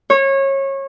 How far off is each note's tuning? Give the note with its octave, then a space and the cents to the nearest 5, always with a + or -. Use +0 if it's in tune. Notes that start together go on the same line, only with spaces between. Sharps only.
C#5 -25